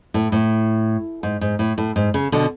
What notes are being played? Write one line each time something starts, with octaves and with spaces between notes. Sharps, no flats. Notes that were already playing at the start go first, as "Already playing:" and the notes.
A2
A2
G#2
G#2
A2
A2
G#2
C#3
B2 D3